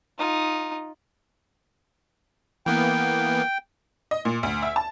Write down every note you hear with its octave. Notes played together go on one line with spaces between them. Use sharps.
D#4 F4
E3 A#3 B3 G5
D#5
A#2
D2
E5
A5